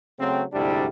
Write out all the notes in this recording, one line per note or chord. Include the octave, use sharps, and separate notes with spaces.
C#3 F#3 A3 C4
D2 G#2 C3 G3 D4 E4